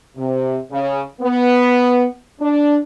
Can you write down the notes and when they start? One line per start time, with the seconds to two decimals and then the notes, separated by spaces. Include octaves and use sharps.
0.17 C3
0.72 C#3
1.22 B3
2.40 D4